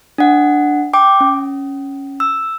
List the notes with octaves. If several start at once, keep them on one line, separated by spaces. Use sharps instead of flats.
D4 F#5
G5 D6
C#4
E6